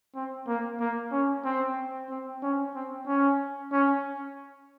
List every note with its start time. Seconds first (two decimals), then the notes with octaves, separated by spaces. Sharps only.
0.15 C4
0.47 A#3
0.80 A#3
1.12 C#4
1.45 C4
2.10 C4
2.43 C#4
2.75 C4
3.07 C#4
3.72 C#4